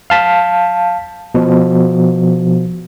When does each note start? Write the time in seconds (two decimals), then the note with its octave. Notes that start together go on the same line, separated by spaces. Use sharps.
0.10 F5 A5 B6
1.35 B2 F3